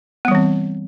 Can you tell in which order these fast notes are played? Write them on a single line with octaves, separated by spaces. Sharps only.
B3 G3 E3 C4